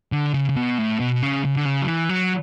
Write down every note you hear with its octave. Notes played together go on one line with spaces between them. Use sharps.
D3
C#3
C#3
B2
A2
B2
C#3
C#3
D3
C#3
F#3
E3
F#3